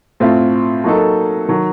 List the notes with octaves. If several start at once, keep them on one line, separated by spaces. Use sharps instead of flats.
A2 A3 C4 F4
F#3 A#3 D#4 A4
D#3 F#3